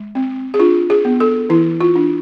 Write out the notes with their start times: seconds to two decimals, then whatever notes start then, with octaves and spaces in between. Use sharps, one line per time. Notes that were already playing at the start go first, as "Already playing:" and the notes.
Already playing: G#3
0.15 C4
0.54 G#4
0.59 D4 F4
0.90 G#4
1.05 B3
1.20 A4
1.49 E3 E4
1.81 F4
1.96 D4